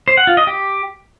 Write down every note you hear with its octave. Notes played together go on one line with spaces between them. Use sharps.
C5
F#5
F4
D#5
G4